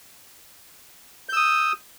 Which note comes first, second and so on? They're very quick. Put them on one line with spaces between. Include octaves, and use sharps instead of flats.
G6 E6 D#6